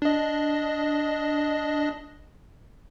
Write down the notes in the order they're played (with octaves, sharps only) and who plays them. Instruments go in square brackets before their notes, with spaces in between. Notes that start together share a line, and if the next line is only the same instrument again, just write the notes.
[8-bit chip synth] D4 D#5